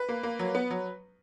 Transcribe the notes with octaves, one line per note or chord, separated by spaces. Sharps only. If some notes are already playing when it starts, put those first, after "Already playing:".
Already playing: B4
A#3
A#3
F#3
B3
F#3